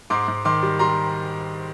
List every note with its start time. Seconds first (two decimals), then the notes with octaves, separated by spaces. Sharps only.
0.10 G#2 C6 D6
0.28 G#2
0.45 D#3 C6 D6
0.63 G3
0.79 G3 A#5 C6